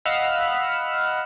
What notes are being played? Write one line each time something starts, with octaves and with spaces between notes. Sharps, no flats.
D#5 F5 F#5 B5 E6 F6